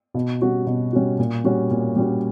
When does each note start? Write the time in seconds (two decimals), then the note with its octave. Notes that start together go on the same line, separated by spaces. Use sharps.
0.14 B2
0.42 G3 C#4 F#4
0.66 B2
0.93 G3 C#4 F#4
1.19 A#2
1.44 G3 C#4 F#4
1.71 A#2
1.96 G3 C#4 F#4